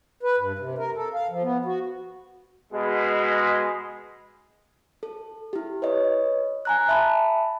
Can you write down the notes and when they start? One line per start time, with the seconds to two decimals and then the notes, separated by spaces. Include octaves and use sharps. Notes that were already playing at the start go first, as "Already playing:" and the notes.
0.23 B4
0.38 G2
0.58 C3
0.78 A#4
0.95 A4
1.14 F5
1.30 F3
1.43 B3
1.65 F#4
2.73 B2 G#3
5.03 A4
5.53 E4 G4
5.82 B4 C#5 D#5
6.65 G#5 A#5 F#6
6.89 E5 A5 B5